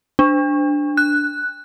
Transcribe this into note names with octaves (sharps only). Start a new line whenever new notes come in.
D4
F#6